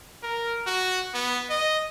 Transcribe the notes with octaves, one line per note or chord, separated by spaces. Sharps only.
A#4
F#4
B3
D#5